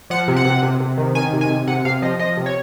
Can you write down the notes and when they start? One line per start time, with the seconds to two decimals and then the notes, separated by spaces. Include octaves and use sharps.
0.10 F3 F#5
0.28 C3
0.36 F#5
0.45 C3
0.63 C3
0.80 C3
0.98 D#3
1.15 D#3 G#5
1.33 C3
1.41 G#5
1.50 C3
1.67 C3 F#5
1.85 C3 F5
2.02 F3 D#5
2.19 F3 D#5
2.37 C3
2.46 C#5